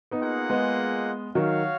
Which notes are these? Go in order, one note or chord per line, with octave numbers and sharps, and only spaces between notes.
B3 D#4
A#3 F4 G#4 D#5 F#5
G#3 B3
D#3 F#3 F#4 C#5 F5